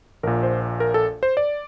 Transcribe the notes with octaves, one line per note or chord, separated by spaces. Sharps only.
A#1 A#2 A#4
C5
A#4
A4
C5
D5